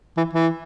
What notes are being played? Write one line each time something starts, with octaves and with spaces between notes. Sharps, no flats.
E3
E3